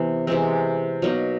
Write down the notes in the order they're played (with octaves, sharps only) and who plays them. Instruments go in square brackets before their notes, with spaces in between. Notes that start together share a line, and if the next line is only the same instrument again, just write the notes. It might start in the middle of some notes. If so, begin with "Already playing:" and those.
Already playing: [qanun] C3 E3 B3
C3 E3 G#3 C4
B2 F#3 A#3 D#4